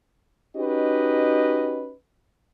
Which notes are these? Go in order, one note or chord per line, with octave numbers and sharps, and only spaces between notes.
C#4 D#4 F#4 G4 B4 D#5